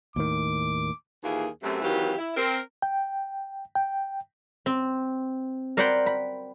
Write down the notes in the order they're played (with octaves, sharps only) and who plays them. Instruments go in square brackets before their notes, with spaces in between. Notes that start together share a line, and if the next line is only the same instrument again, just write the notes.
[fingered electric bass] D#2 A2 D#3 [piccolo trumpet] D6
[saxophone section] D#2 A#2 E3 A#3 G#4
F#2 C3 A3
D#3 E3 F#3 A#3 C4 G4
E4
C4 A#4
[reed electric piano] G5
G5
[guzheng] C4
A#4 C5 D5 F#5 G5 B5
B5